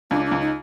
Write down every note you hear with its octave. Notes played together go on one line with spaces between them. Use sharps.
C#2 D4
D4
C#2
D#4